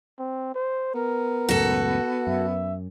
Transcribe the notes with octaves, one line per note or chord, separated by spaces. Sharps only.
C4
C5
B3 A#4
C#2 F#2 A2 F#4 A4
F#2 E5